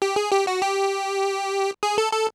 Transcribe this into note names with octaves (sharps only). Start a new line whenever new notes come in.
G4
G#4
G4
F#4
G4
G#4
A4
A4